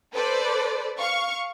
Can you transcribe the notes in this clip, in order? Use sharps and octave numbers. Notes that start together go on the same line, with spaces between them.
A4 B4 C5 D5
F5 C#6